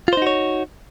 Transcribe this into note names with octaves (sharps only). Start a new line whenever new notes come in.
D#4 F4 F#4 C5 C#5